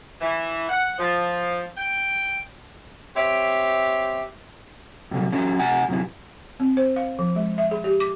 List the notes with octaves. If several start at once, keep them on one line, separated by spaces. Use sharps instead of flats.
E3
F#5
F3
G5
C4 G4 C#5 E5
G2 C3 F#3
E3 F#3 C#4
C3 F#5 G#5
F#2 C3 E3
C4
C5
F5
F3
G#3
E5
G#4
G4
D6